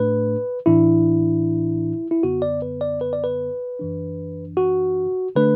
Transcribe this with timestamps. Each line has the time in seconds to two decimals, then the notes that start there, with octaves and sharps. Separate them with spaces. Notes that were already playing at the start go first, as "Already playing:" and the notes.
Already playing: A2 A3 D4 B4
0.66 A1 A2 E3 D4 E4
2.11 E4
2.23 F#2 D3 B3 F#4
2.42 D5
2.62 B4
2.81 D5
3.01 B4
3.13 D5
3.24 B4
3.79 F#2 E3 D4
4.57 F#4
5.35 D3 A3 D4 B4